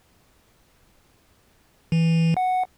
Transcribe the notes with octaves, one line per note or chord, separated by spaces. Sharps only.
E3
F#5